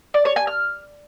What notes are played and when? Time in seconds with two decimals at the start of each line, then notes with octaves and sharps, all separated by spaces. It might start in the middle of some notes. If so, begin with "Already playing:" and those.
0.14 D5
0.25 C#5
0.36 G#5
0.47 F6